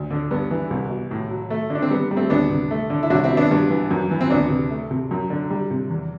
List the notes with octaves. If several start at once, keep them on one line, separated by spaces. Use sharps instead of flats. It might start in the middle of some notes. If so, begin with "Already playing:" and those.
Already playing: D2
D3
G2 B3
E3
C2
B2
A2
F#3
A3
D3
D4
C4
G3 B3
B3
G3
A3 C4
D2 B3 D4
C3
A3
D3
E4
C2 D4 F#4
C4 E4
B2
B3 D4
G2
E3
F#2
E3
C4
D2 B3 D4
C3
A3
C3
F#2
D3
G3
C3
E2